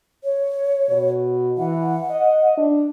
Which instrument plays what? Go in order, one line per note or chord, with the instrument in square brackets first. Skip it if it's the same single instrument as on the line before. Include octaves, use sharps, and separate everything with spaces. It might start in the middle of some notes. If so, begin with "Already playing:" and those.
[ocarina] C#5
[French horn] B2
[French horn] E3 [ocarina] F#5
[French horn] D#5
D4